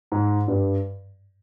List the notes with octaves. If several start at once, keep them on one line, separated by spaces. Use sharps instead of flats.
G#2
G2